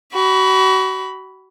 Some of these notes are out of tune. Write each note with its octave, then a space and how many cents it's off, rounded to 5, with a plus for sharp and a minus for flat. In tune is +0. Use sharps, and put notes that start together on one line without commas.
F#4 +35 B5 +0